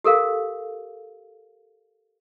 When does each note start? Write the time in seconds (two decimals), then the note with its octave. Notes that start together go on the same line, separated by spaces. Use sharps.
0.04 G4 A4 A#4 F5